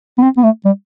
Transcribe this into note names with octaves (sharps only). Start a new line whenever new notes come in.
B3
C4
B3
A3
G3